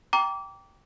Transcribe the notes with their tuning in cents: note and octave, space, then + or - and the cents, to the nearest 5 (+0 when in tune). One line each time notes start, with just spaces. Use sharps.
G5 +0 A#5 +0 D6 -20